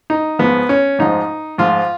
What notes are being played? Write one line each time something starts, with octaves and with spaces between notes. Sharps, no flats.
D#4
G#2 F3 B3
C#4
G#2 F3 D#4
G#2 F3 F4